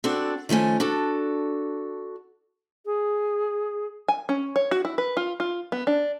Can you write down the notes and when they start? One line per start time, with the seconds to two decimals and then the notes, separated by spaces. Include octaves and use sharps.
0.04 C4 D4 F#4 A4 D5
0.49 D#3 F3 A3 C#4 G#5
0.80 D4 F#4 A4
2.86 G#4
4.08 G#5
4.29 C#4
4.56 C#5
4.71 F#4
4.85 E4
4.98 B4
5.17 F4
5.40 F4
5.72 B3
5.87 D4